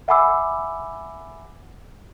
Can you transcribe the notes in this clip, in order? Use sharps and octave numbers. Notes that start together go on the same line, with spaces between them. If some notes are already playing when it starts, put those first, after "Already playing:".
E5 F#5 G#5 B5 D6 E6